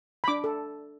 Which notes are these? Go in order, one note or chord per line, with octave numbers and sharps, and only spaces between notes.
B5
D4 D6
A4